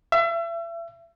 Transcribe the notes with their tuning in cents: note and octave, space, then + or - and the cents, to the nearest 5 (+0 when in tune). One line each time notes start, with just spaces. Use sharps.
E5 +35